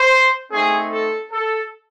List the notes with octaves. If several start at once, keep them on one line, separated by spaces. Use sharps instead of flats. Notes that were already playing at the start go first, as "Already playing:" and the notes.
Already playing: C5
A3 C4 D#4 G#4
A4
A4